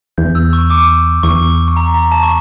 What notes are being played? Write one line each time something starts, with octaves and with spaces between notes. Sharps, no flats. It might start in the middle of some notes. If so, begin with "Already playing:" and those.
E2 G6
E6
C#6
D6
E2 C#6
C#6
A#5
A#5
A5
C#6